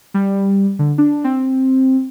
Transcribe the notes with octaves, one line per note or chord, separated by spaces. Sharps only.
G3
D3
D4
C4